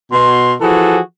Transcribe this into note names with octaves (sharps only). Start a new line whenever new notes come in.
B2 C6
E3 F3 F#4 G#4 A4